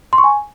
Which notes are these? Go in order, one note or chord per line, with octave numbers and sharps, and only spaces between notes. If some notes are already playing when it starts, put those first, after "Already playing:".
C6
C#6
G#5